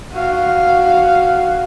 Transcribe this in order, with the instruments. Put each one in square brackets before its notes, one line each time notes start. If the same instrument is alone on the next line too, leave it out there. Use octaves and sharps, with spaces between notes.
[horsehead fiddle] F#4 F5